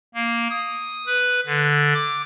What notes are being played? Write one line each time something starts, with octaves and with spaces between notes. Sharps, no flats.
A#3
D#6
B4
D3
D6